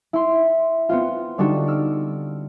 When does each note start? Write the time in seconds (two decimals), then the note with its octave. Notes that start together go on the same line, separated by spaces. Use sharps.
0.13 E4 C6
0.89 B3 C4 F4
1.38 D3 G3 D4 D#4 F#4
1.67 E6 F6 D7